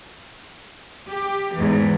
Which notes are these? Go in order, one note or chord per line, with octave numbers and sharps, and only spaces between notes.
G4
E2 G#2 E3